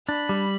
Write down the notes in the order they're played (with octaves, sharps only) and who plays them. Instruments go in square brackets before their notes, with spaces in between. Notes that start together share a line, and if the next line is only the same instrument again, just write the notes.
[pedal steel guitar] D4 [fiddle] B5
[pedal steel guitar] G3